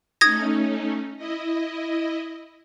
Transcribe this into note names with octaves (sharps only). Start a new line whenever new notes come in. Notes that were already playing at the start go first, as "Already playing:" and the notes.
A3 C#4 D#4 D#6 G#6 A#6
E4 D#5